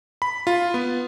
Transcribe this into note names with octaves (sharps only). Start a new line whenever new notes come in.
B5
F4
B3